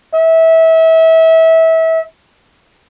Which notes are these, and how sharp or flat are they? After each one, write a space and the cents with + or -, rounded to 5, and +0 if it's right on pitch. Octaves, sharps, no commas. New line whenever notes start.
E5 -25